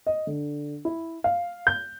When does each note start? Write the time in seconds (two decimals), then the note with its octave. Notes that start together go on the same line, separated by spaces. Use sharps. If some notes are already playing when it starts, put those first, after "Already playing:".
0.07 D#5
0.27 D3
0.85 E4
1.24 F5
1.67 G6